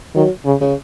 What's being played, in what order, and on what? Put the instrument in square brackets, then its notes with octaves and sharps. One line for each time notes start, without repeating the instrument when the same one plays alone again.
[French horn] D#3 [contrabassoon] F#3
[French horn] C#3
[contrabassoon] C#3